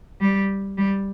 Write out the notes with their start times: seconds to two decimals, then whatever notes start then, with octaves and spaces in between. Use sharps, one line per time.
0.21 G3
0.78 G3